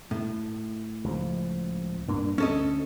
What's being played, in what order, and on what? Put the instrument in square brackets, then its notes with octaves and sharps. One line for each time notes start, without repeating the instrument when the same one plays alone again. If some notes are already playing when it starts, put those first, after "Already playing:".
[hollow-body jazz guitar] A2
[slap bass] C#2 F3
G2 A#3 D4
[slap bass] D2 [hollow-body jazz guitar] C#4 A4 D#5